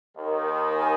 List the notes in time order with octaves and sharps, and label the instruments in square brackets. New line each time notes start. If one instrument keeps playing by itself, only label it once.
[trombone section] D#2 D#3 [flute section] A#4
[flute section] A#4
G#5